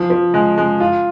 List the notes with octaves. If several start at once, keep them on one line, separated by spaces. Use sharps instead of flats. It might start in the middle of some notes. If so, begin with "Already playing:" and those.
Already playing: F3
F3
G#3
G#3
F4